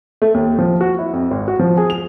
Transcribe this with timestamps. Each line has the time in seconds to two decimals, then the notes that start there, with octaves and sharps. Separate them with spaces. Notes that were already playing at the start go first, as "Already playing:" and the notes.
0.22 A3
0.34 D#2
0.59 F3
0.81 F#4
0.99 E4
1.13 F2
1.31 G#1
1.48 F#4
1.59 F3
1.77 G#4
1.90 F7